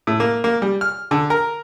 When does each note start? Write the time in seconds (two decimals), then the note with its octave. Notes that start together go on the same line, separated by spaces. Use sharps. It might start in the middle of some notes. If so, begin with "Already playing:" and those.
0.07 A2
0.20 A#3
0.44 A#3
0.62 G3
0.81 F6
1.11 D3
1.30 A#4